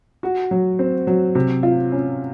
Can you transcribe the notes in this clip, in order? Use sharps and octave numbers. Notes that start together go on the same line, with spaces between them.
F#4
F#3
C4
F#3
C3
F4
C#4